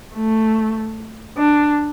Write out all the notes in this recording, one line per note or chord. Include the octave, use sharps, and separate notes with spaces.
A3
D4